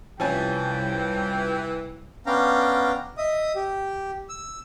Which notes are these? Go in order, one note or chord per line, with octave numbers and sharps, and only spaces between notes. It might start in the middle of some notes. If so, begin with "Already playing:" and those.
C2 E3 F3 C#4 G5 G#5
B3 C#4 D4 F5 G5 A#5
D#5 E5 D#6
G4
E6